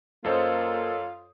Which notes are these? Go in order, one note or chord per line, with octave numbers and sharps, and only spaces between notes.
F#2 A#3 F4 A4 C5 C#5 D#5 D#6